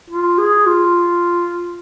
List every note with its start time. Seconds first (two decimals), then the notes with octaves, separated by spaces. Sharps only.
0.10 F4
0.38 G#4
0.66 F4